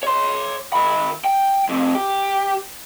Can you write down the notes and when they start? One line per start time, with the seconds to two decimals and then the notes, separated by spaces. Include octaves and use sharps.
0.03 C#5 C6
0.73 D#3 B5
1.24 G5
1.69 F2 C3
1.95 G4